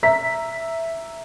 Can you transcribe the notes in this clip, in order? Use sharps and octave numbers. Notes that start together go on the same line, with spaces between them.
E5 A#5 B6